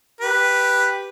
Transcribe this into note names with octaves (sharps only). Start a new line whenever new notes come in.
G4 B4